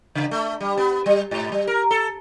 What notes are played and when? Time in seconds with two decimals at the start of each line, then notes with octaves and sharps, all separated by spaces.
0.15 C#3
0.31 A3
0.61 G3
0.77 B3
1.06 G3
1.31 G#2
1.52 G3
1.67 A#4
1.91 A4